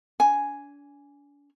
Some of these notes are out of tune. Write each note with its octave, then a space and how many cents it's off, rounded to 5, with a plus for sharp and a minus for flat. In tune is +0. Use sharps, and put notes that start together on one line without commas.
D4 -40 G#5 +0